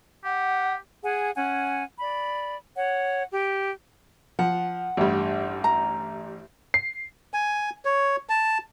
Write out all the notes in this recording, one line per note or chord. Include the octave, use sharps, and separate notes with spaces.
G4 F#5
G#4 F#5 G#5
C#4 F#5 G#5
D5 B5
C#5 F#5
G4
F3 F#5
A1 G2
A#5
C7
G#5
C#5
A5